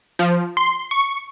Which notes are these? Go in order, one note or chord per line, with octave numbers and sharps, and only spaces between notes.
F3
C6
C#6